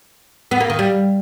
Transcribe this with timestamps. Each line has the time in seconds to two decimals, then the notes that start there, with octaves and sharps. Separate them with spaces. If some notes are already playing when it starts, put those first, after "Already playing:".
0.51 B3
0.60 A#3
0.70 D#3
0.79 G3